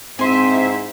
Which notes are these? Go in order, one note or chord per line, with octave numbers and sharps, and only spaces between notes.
G#2 C4 E4 C5 E5 G#5 C6